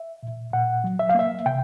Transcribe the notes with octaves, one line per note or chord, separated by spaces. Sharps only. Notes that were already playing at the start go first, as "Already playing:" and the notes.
Already playing: E5
A#2
A#2 F#5
F#3
E5
F5
A#3 E5
C3 G5